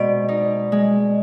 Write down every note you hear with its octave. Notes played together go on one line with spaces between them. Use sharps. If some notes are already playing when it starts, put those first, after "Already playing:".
Already playing: B2 G#3 C4 D5 D#5
D#4
G#3